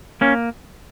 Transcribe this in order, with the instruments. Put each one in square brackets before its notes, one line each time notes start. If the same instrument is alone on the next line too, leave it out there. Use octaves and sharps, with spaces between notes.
[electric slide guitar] A#3 C#4